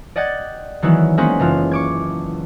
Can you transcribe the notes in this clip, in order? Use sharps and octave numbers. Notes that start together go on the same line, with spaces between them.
D5 D#5 F#5 G5 G#6 A6
D#3 E3 F#3 G#3 B3 E4
G#3 A#3 B3 C#4 B4 C5
F#1 E3 F4
C#6 D6 G#6